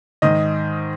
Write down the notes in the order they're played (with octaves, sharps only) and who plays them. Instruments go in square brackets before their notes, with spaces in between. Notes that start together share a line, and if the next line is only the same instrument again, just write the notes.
[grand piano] G#2 D#3 D#5